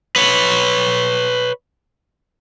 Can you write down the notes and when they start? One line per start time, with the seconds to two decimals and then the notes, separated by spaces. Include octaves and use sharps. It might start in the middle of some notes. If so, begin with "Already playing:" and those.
0.16 B4 C#5